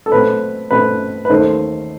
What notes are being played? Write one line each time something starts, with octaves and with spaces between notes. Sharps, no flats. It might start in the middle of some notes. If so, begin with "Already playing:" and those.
A4
B2 A3 C4 B4
B2 A3 C4 B4
B4
D#2 D#3 A3 C5